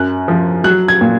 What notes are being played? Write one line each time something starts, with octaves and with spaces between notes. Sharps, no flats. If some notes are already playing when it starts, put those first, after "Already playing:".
Already playing: F#2 F#6
F3
F#3 F#6
G#6
A#2